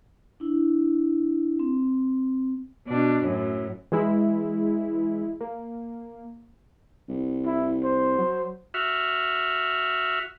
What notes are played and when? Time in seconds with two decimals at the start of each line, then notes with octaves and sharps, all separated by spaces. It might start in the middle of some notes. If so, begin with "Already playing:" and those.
0.40 D4 E4
1.59 C4
2.88 B2 D4
3.23 F#2 A2
3.92 E3 G#3 E4
5.41 A#3
7.09 C2
7.46 E4
7.84 C5
8.18 F#3
8.74 F#4 E5 F6